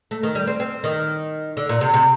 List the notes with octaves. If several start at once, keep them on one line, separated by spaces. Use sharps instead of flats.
A3
D#3
G3
C4
C4
D#3
D3
A#2
C3
C3